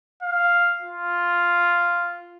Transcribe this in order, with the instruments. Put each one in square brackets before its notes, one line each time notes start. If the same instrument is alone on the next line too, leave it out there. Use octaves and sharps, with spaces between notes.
[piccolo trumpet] F5
F4